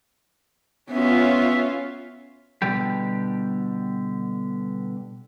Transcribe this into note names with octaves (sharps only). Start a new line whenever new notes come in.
B3 C#4 F4 E5
B2 D3 G3 G4